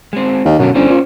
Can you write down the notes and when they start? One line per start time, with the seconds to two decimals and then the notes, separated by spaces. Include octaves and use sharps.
0.13 G#3 C4
0.45 D#2
0.59 F#2 B2 D3
0.75 G1 C#4 C5 D5
0.89 A#2